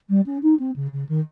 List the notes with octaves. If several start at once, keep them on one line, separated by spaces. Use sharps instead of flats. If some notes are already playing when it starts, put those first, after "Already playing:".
G3
C#4
D#4
C4
C#3
C#3
D#3